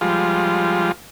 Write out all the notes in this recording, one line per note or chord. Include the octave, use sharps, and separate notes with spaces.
F3 G3 G#3 F4